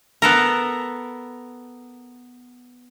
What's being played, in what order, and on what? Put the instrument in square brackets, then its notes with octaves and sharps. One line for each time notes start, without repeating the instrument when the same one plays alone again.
[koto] B3 A4 A#4